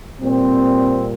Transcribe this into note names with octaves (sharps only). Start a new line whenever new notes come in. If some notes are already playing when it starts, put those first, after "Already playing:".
A#2 G3 C4